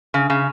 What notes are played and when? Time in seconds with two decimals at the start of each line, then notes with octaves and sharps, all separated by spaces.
0.14 C#3
0.30 C#3